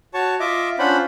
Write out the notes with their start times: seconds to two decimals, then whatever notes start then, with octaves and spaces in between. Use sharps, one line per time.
0.14 F#4 C#5 A5 C#6
0.40 F4 D#5 E5 D6
0.79 C#4 D4 F4 C5 F#5 B5